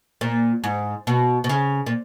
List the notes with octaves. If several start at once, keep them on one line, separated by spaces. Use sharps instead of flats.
A#2
G#2
B2
B2
C#3
A#2